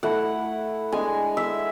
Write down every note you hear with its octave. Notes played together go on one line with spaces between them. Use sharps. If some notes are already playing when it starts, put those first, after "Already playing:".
A3 E4 F#5
G#3 D4 G#5
E5